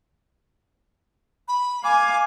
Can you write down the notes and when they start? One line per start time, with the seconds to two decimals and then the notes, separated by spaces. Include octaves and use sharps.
1.48 B5
1.83 F5 G#5 D6